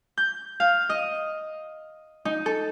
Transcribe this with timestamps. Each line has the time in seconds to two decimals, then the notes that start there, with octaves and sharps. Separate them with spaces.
0.18 G6
0.60 F5
0.90 D#5
2.25 D#4
2.46 A4